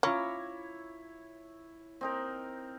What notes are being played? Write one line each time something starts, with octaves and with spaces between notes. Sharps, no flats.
C#4 E4 F4 C#5 A#5 D6
C4 D#4 A#4